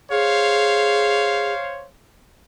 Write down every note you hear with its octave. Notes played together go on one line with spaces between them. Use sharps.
G#4 C5 C#5 F5